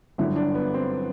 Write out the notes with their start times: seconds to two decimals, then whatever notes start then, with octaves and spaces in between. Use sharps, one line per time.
0.18 G1 F#2 D3 E4
0.36 D4
0.55 B3
0.74 C4